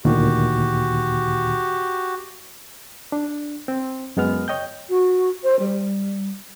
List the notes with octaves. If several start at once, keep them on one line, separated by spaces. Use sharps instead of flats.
D2 A#2 D#3 F#4 G4
D4
C4
F#2 G#3 B3 F6
C#5 D#5 G5 G6
F#4
C5
G3